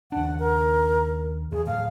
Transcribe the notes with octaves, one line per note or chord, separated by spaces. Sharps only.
D#2 D4 F#5
A#4
E2 G#4
A2 D3 F5